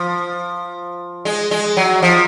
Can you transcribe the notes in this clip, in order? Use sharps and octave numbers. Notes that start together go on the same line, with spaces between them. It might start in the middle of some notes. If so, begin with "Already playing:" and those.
Already playing: F3
G#3
G#3
F#3
F3